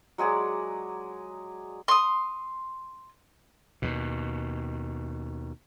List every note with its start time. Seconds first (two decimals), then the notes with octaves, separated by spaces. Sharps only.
0.18 F#3 G#3 G#4 D5
1.88 C6 D#6
3.82 D#2 B2